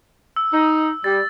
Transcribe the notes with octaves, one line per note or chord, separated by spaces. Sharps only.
E6
D#4
G3 A6